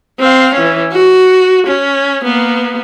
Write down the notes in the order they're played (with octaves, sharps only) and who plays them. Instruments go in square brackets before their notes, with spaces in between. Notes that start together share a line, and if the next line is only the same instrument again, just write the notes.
[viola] C4 F5
E3 C#4
F#4
C#4
A#3 B3